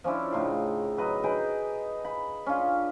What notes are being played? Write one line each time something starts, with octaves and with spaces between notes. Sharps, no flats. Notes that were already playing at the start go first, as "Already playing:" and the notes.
F3 C#4 D4 E4
A2 C#3 D#4 C6
F#3 B4 D#5
D#4 G#4 B4 G5
B5
C#4 D4 F4